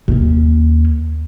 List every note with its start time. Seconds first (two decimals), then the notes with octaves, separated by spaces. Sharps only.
0.08 D#2 C#4